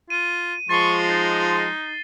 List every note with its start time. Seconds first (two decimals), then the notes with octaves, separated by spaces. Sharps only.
0.10 F4 D#7
0.69 F3 G#3 C#6 A6 C7 G7
1.09 D#4 A6